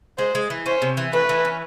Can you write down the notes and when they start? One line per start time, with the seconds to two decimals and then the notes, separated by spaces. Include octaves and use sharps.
0.18 G#3 C5
0.35 G#3
0.50 E3
0.66 C#4 C5
0.82 C3
0.97 E3
1.13 A3 B4
1.29 E3
1.45 C#4